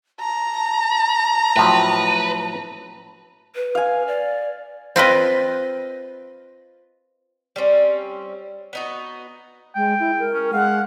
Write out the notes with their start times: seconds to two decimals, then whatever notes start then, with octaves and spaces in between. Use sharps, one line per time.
0.20 A5 A#5
1.56 A2 F3 F#3 B4
3.55 B4
3.75 F5 G#5
4.07 D5
4.96 C4 F4 B4 D#5
7.56 G3 C4 C#4
8.73 B3 D#4 F#4
9.75 G#3 G5
9.99 E4
10.19 A#4
10.34 C#4
10.53 G#3 F5 F#5